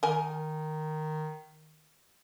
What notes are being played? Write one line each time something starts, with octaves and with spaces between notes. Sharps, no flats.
D#3 A#4 G#5